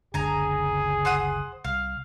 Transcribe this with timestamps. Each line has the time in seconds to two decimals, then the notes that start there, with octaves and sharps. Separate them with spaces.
0.14 F#1 C#2 D3 G#4 G#5 A#5
1.05 C5 F#5 D#6
1.65 C2 F5